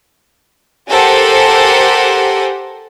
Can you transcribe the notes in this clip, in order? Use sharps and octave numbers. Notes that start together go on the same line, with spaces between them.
G4 A4 A#4 C5 F#5 G#5